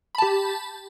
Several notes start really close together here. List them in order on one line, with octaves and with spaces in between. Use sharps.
B5 A5 G4